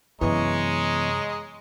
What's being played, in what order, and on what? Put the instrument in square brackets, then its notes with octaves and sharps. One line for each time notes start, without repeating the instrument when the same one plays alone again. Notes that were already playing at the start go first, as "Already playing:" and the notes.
[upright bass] F#2 C3 [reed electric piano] E3 B3 [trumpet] G#3 [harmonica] C#5 D#5 A#5